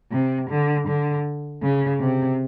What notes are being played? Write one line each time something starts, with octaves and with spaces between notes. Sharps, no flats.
C3
D3
D3
C#3
C3